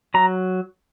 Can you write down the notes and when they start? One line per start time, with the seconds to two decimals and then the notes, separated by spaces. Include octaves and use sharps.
0.14 F#3 A#5